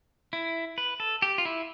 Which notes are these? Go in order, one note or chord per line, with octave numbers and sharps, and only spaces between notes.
E4
B4
A4
G4
F4
E4